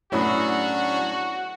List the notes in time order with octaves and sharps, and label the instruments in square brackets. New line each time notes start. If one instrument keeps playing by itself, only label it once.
[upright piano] A2 [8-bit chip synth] F#3 C#4 D4 [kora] B3 G#4 E5 [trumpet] F#4